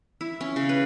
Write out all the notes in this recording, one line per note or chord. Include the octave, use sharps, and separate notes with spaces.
E4
C#4
C#3
B4